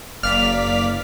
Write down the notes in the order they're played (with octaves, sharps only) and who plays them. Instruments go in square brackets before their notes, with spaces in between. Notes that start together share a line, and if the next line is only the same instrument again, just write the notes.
[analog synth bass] F#1 [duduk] A#3 [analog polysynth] D5 F5 B6 [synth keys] F6